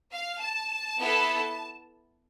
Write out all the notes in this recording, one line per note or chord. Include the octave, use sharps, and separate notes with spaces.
F5
A5
B3 E4 A4